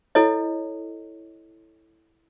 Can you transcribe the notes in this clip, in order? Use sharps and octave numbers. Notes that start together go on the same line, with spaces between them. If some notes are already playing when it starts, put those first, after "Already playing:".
E4 A4 C#5 D#5